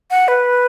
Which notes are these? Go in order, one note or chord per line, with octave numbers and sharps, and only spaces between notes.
F#5
B4